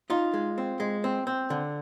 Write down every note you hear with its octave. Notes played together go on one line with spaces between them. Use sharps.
D#4 F4
G#3
C4
G#3
C4
C4
D3